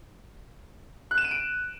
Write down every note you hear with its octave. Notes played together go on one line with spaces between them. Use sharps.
F#6
E7
D#7
D7